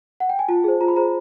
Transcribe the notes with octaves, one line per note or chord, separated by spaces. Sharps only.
F#5
G5
G#5
F4 A5
G#4 C5
F4 A#5
B5
G#4 C5 A#5